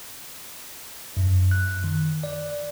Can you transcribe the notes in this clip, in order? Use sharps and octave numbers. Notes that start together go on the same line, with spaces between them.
F#2
F#6
D#3
D5